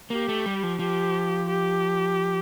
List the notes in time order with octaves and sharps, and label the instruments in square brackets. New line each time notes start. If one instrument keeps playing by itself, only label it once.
[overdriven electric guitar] A#3 [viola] G4
[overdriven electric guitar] A3
G3
F3
[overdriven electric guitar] F3 [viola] G4
[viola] G4